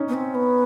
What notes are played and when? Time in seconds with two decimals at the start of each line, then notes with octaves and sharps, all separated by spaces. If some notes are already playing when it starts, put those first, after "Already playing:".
Already playing: C#4 D#4
0.08 B3
0.14 C4
0.35 B3